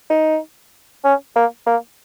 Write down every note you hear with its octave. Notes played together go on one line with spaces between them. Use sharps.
D#4
C#4
A#3
A#3